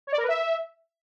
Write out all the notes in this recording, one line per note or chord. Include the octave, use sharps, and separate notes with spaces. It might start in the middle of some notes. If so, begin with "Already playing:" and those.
C#5
D5
A#4
B4
E5